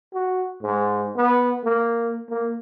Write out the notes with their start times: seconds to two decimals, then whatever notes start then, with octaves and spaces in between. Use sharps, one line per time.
0.14 F#4
0.62 G#2
1.16 B3
1.65 A#3
2.29 A#3